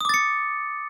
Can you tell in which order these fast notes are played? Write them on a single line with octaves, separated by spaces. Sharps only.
D#6 D6 A6 C#7